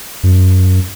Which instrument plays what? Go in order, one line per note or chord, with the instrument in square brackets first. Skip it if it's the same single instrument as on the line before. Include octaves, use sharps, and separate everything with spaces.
[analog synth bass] F#2